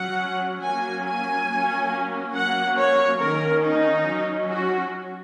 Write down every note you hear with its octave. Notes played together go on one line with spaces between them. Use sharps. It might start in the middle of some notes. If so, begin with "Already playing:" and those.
Already playing: F#3 C#4 F#5
F#3 A#3 C#4 G#5
G#5
F#3 A#3 C#4
F#3 A#3 C#4 F#5
C#5
D#3 A#3 C#4 A#4
D#4
F#3 C#4
F#4